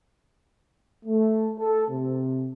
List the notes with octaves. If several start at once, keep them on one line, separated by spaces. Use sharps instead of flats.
A3
A4
C3